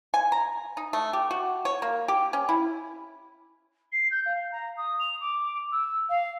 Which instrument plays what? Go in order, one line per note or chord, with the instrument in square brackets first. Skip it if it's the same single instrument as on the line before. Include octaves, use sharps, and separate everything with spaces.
[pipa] G#5
A#5
D#4
A3
G4
F#4
C#5
A#3
G4
C#4
E4
[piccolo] C7
G6
F5
A#5
D#6
F7
D6
E6
F5